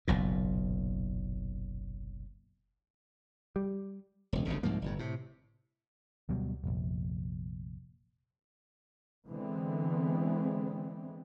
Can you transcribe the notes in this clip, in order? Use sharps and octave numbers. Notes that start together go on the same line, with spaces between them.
F#1 B1 A#2
G3
E1 C#2
G1 D2 C#3
C2 G#2 F3 A#3
G1 A2
A2 C3
D2 B2 F#3 G3
F1 A#1
D3 E3 G#3 B3 C4